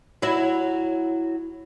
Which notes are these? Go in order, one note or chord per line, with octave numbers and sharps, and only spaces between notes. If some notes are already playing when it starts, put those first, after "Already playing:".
F#3 E4